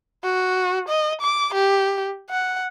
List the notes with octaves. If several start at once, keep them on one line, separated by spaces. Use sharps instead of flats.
F#4
D#5
D6
G4
F#5